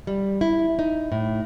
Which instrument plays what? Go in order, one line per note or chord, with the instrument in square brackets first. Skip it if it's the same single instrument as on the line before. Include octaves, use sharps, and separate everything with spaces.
[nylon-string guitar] G3
E4
D#4
A2